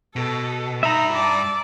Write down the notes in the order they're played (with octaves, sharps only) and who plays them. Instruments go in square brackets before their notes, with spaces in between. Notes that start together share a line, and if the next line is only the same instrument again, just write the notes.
[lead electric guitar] B2 [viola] A4
[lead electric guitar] G2 B5 [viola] D#4 [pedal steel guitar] E5 A#5
[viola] D5 A5